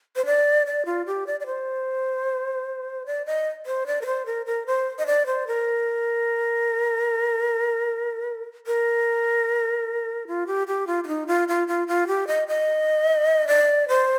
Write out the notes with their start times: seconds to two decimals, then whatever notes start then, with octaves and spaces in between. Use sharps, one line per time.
0.16 C5
0.26 D5
0.67 D5
0.86 F4
1.06 G4
1.27 D5
1.40 D5
1.46 C5
3.06 D5
3.26 D#5
3.66 C5
3.87 D5
4.01 A#4
4.06 C5
4.26 A#4
4.46 A#4
4.67 C5
4.99 D#5
5.07 D5
5.26 C5
5.47 A#4
8.67 A#4
10.27 F4
10.47 G4
10.67 G4
10.87 F4
11.04 F4
11.07 D#4
11.27 F4
11.48 F4
11.68 F4
11.88 F4
12.07 G4
12.27 D#5
12.48 D#5
13.48 D5
13.88 C5